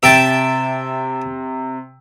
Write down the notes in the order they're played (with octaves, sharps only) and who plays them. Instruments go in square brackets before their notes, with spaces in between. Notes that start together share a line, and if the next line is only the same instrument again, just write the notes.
[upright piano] C3 [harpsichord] E5 G5 A5